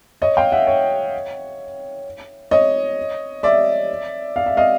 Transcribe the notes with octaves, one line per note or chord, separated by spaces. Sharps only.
C#5 D#5
F5 G5
E5 F#5
C#5
C#5 D#5
D5 E5
F5
E5
D#5 F5